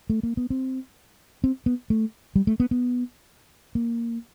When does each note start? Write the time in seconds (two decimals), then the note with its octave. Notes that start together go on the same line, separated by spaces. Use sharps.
0.10 A3
0.23 A#3
0.37 B3
0.50 C4
1.44 C4
1.66 B3
1.90 A3
2.36 G3
2.47 A3
2.60 B3
2.71 B3
3.75 A#3